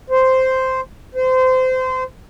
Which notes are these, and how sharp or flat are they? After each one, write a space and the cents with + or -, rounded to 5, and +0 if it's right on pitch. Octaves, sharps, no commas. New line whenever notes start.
C5 -5
C5 -25